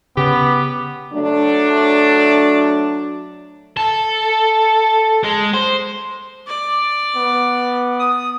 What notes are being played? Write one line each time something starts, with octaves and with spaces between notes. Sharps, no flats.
C#3 B3 G4
F#3 A3 D4
A4
G#3
C5
D5
B3
D#6